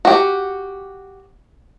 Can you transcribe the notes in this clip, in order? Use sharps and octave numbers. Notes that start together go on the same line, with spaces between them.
F#4 G4